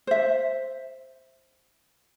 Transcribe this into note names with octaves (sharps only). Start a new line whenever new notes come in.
C5 E5